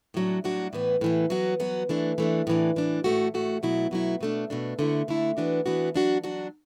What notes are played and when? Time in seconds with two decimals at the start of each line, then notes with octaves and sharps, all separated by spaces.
0.14 A2 F#3 D4 F#4
0.44 A2 F#3 D4 F#4
0.73 A2 E3 B3
1.01 A2 E3 B3
1.30 F#3 B3 F#4
1.60 F#3 B3 F#4
1.89 E3 A3 D4
2.18 E3 A3 D4
2.47 A2 E3 D4
2.76 A2 E3 D4
3.04 A2 A3 F#4
3.34 A2 A3 F#4
3.63 B2 F#3 A3 E4
3.91 B2 F#3 A3 E4
4.21 B2 A3 D4
4.50 B2 A3 D4
4.79 D3 A3 E4
5.08 D3 A3 E4
5.37 E3 B3 D4 F#4
5.66 E3 B3 D4 F#4
5.94 F#3 D4 F#4
6.24 F#3 D4 F#4